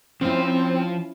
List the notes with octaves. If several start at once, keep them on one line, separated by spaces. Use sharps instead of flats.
F3 C4 C#4 E4 C5